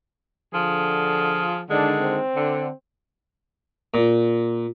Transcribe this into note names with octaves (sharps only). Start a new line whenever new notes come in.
D3 F3 F4 G#4
D3 D#3 G#3 D4
C4
D3
A#2